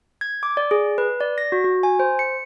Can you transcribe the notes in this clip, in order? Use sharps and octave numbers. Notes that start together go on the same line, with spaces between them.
G#6
D6
D5
G#4
B4
D5
A#6
F#4
F#4
G#5
C5
C#7